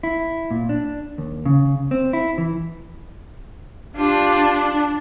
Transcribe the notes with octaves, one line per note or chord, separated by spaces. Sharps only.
E4
A#2
D4
D#2
C#3
C4
E4
E3
D4 F4 G4